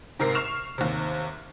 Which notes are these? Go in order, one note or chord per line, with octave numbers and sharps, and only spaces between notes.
G#2 C3 A#4 C7
C#6 F6 E7 F7
D#2 C3